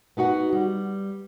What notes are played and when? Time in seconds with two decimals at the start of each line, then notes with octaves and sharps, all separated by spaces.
0.17 B3 D#4 F#4 F#5
0.53 G3